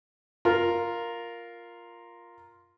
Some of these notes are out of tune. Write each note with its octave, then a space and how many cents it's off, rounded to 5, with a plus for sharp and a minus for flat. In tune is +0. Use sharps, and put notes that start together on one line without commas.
F4 +0 A#4 +0